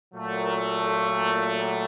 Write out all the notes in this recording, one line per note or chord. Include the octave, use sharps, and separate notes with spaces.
A#2 F#3 A3
A#4
A4
A#4